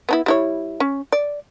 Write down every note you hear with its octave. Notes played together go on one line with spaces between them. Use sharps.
B3 D4 E4
G3 E4 C#5
C#4
D5